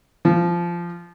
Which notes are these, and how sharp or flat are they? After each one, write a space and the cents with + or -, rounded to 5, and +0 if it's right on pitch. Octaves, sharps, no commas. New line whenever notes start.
F3 -15